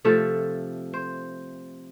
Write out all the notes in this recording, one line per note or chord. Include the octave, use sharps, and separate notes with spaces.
C3 F3 A3 A4
C5